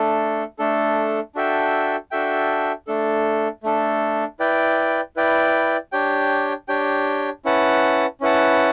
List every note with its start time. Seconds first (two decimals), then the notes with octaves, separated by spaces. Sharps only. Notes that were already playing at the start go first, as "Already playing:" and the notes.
Already playing: A3 D4 A4
0.59 A3 D4 A4
1.35 D4 F#4 A4 E5 G5
2.11 D4 F#4 A4 E5 G5
2.87 A3 D4 A4
3.63 A3 D4 A4
4.40 E4 B4 D5 G5
5.16 E4 B4 D5 G5
5.92 D4 G4 C#5 G5
6.68 D4 G4 C#5 G5
7.45 C#4 E4 B4 F#5 A5
8.21 C#4 E4 B4 F#5 A5